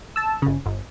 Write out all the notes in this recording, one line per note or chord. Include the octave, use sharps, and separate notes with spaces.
A5 E6
G1 C#3
G1